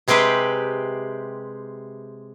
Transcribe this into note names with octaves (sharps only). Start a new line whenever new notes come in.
C3 G#3 C4 G4 B4